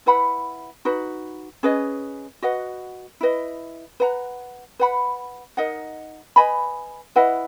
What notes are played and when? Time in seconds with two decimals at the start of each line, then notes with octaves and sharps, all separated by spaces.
0.06 E4 B4 F#5 B5
0.85 D#4 F#4 B4
1.63 C#4 G#4 B4 D#5
2.42 F#4 B4 D#5 F#5
3.21 E4 B4 D#5
4.00 B4 F#5 A#5
4.79 B4 F#5 B5
5.57 D#4 A#4 D#5 F#5
6.36 B4 D#5 G#5 B5
7.16 E4 B4 D#5 F#5